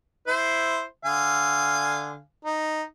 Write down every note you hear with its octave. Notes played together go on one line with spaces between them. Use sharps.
E4 C5
D3 F5 G#5
D#4